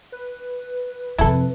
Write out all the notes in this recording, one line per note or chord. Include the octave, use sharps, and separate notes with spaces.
B4
F2 C3 E4 A4